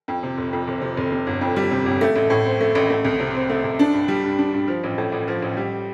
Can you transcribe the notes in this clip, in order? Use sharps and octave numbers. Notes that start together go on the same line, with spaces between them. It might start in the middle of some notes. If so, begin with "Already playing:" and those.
F2
C3
F1
F2
F1
C3
F1
C3
G1
F2
G3
C3
G1
A3
A1
A2
C4
A3
A1
A3
C2
C3
C4
A3
C2
D4
G2
G3
G2
D4
G2
F3
A1
A2
A1
F3
A1
G3